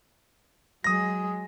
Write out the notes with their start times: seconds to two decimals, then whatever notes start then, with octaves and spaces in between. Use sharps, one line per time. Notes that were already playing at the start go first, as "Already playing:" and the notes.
0.84 F#3 G#3 D#6 A#6